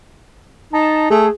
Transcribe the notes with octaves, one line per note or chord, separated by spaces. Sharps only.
D#4 A5
A3 G#4